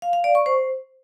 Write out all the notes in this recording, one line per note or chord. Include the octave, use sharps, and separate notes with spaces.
F5
F5
D5
C#6
C5